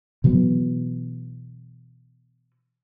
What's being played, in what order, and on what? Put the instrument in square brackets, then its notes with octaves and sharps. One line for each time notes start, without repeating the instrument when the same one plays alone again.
[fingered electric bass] B2 E3 F#3 B3